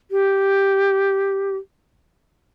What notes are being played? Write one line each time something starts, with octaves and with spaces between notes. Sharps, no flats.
G4